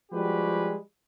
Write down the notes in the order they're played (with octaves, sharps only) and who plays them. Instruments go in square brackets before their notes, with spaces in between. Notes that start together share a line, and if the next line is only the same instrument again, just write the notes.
[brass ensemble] F3 G3 G#3 F#4 G4 B4